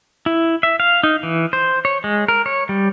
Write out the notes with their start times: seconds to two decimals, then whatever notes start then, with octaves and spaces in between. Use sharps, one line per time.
0.26 E4
0.63 E5
0.80 F5
1.03 D#4
1.23 E3
1.53 C5
1.85 C#5
2.04 G#3
2.28 A#4
2.46 C#5
2.69 G3